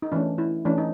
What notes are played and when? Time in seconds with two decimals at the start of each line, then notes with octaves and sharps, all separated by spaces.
0.02 D#4
0.12 E3 A3 C#4 D4
0.38 E4
0.65 E3 A3 C#4 D4
0.78 D#4